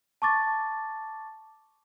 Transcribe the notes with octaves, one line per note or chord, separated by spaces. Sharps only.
A5 C#6 D6 A6